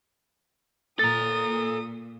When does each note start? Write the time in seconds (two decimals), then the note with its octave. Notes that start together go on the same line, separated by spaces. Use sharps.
0.99 A#2 A4 A#5 D#6 A6